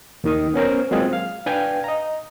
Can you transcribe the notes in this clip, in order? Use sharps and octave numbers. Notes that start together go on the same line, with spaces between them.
D#2 D#3 D#6
B3 C#4 A#4 C5
F#3 G#3 A#3 C4 F4 G#4
F5
D4 B4 F5 G5 G#5
D#5 A#5